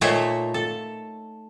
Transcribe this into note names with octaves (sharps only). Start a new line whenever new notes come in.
A#2 A3 D#4 C5 C#5 E5
A4